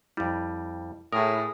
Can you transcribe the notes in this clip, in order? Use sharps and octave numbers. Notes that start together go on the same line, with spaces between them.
F2 G3 E4
A2 E4 G#4 A#4 D#6